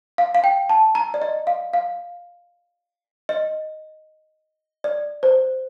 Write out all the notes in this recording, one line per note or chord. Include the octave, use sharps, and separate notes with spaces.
F5
F5
G5
A5
A#5
D5
D#5
F5
F5
D#5
D5
C5